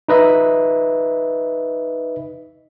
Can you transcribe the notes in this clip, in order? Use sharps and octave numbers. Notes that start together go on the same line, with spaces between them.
D#4 B4 D#5 E5